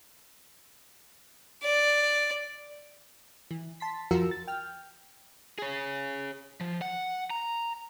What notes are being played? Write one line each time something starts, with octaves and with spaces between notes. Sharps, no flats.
D5
E3
A5 C6 B6
F2 F3 F4 F#4 A#4 E6
A6
G5 F6
G#4 C#5
F3
F#5
A#5